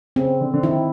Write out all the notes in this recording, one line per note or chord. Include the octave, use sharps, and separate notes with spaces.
C#3 C4
D3
D3
D#3 E4